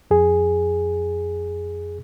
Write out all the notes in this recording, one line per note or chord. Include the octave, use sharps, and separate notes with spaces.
F2 G#4